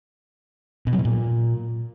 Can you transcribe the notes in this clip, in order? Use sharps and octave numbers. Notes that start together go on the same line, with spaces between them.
B2
F#3
B2
A#2